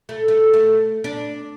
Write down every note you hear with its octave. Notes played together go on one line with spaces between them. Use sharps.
A3
A3
A3
D4